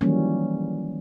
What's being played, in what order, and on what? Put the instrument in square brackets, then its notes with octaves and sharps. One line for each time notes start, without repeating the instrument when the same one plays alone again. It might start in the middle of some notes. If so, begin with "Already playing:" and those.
[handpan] D#3 E3 F#3 G3 A#3 C#4